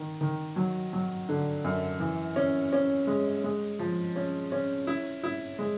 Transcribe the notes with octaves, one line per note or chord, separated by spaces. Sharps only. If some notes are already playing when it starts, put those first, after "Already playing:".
Already playing: D#3
D#3
F#3
F#3
D3
F#2
E3
C#4
C#4
G#3
G#3
F3
C#4
C#4
E4
E4
G#3